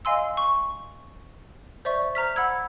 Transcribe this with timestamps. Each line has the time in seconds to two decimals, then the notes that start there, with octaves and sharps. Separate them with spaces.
0.05 D#5 F5 G#5 C6 E6
0.37 C#6
1.85 C5 D5 E5 C#6
2.15 C5 A#5 F6 B6
2.36 F#5 B5 E6 G#6